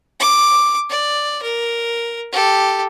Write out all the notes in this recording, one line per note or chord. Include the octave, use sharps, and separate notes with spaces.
D6
D5
A#4
G4 A4